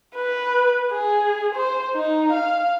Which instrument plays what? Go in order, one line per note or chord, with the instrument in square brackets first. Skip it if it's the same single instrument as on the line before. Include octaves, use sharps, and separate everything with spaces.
[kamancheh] B4
G#4
C5
D#4
F5